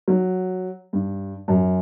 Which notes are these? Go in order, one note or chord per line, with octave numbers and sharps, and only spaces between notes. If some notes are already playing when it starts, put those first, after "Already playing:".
F#3
G2
F#2